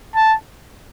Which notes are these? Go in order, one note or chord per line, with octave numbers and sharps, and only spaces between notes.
A5